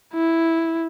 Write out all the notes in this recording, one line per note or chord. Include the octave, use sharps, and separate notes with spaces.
E4